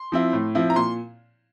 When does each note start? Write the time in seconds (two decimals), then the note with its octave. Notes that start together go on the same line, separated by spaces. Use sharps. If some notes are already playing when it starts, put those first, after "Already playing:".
Already playing: C6
0.12 F3 C4 E4
0.33 A2
0.55 F3 C4 E4
0.70 A#5
0.76 A#2 C6